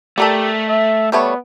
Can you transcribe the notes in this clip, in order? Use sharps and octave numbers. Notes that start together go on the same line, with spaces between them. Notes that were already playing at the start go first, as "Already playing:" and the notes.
A3 G4 A4 A#4 D5
E5
G3 A3 B3 C#5